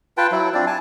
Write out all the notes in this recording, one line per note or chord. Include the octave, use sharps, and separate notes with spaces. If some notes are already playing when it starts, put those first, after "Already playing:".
F4 B4 G5 A5
F#3 E4
C4 D4 F4 D5
G#5 A5